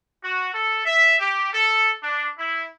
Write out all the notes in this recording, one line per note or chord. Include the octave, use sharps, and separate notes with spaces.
F#4
A4
E5
G4
A4
D4
E4